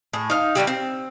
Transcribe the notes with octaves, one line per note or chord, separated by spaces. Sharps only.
A2 G#4
D#4 F5
D3 F#3 G3 G4
C4